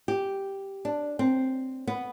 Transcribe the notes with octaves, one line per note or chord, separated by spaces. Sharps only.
G4
D4
C4
B3